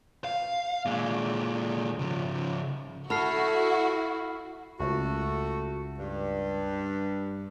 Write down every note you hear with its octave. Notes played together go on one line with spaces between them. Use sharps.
F5
A#2 G#3
C#3 F3
E4 F#4 A4 B5 F6 C7
C#2 A3 F#4
G2